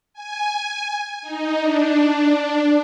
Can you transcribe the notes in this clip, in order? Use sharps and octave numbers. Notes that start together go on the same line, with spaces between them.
G#5
D#4
D4